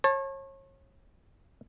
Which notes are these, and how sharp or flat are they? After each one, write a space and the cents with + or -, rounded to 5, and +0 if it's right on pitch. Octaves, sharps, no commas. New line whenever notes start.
C#5 -35 A5 +0